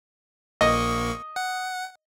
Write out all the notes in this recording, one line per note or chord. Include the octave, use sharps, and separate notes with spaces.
A#1 A#3 D#5 C#6
F#5